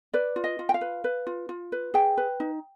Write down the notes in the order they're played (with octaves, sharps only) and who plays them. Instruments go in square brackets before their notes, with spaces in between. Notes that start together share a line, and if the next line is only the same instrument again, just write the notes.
[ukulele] B4 D5
F4
D#5
F4
G5
F5
B4
B4
F4
F4
B4
G#4 G5
B4
D#4